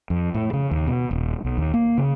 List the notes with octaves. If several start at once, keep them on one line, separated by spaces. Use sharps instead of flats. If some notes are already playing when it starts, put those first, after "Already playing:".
F2
A2
C#3
D#2
B2
D#1
B1
D#2
A#3
C#3